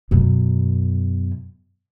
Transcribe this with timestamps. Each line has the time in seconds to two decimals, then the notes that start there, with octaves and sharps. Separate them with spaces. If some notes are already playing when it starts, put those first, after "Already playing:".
0.11 F#2 B2